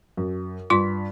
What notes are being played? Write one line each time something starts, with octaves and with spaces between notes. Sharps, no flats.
F#2
G2 F4 C6 B6